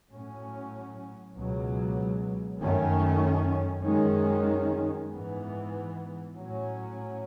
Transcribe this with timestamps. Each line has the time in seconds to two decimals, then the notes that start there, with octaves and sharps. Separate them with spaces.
0.11 A2 F#3 C#4
1.35 C#2 B2 F#3
2.61 F#2 D#3 A3 C#4
3.86 F#2 D#3 G#3 C#4
5.11 G#2 E3 B3
6.35 A2 F#3 C#4